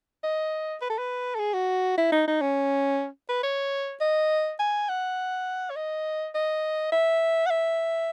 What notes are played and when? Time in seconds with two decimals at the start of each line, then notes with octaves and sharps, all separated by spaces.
0.24 D#5
0.82 B4
0.90 A4
0.98 B4
1.35 A4
1.39 G#4
1.54 F#4
1.98 E4
2.12 D#4
2.27 D#4
2.41 C#4
3.29 B4
3.43 C#5
4.01 D#5
4.60 G#5
4.89 F#5
5.70 C#5
5.76 D#5
6.35 D#5
6.92 E5
7.47 F#5
7.51 E5